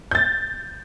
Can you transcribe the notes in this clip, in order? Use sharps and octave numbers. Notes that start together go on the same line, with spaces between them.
G6 A6